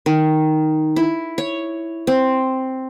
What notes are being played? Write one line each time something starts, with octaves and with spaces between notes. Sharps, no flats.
D#3
E4
C#5
C4